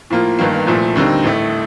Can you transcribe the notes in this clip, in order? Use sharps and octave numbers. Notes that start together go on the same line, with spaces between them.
A2 F3 A#3 F4
G1 G2 D#3 A#3
C2 A#2 F3 A3
D#2 D3 G3 C4 D#4
A1 A2 A3